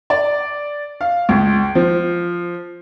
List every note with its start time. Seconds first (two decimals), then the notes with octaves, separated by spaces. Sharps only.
0.10 D5
1.01 F5
1.29 C#2
1.75 F3